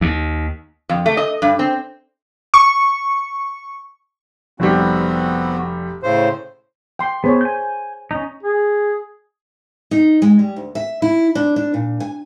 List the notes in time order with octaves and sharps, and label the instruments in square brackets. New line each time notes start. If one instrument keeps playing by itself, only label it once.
[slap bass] D#2
[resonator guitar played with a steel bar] F2
A3
D#5
G2
C4
[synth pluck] C#6
[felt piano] F1 G3 [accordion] B3 C4 F#4
[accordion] A2 C#3 C5
[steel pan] G5 C6
[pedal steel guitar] B3 [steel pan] G#4 C5 C#5
[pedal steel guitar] G#5 G6
C#4 D#4
[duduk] G#4
[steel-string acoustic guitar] D#4
G#3
G3
D2
E5
E4
D4
D4
A#2
G#5